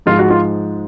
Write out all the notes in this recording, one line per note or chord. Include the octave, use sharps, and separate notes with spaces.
G#2 F3 G#3 F4
F#4
F4